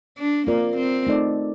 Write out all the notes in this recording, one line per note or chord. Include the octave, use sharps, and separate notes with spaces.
D4
A#3 C4 F4 A#4 D5
C4
A3 D#4 A4 D5